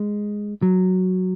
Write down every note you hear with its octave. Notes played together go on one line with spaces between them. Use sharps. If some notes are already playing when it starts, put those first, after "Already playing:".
Already playing: G#3
F#3